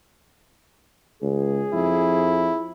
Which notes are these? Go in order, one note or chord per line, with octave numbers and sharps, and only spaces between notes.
C#2 G#4
F2 E4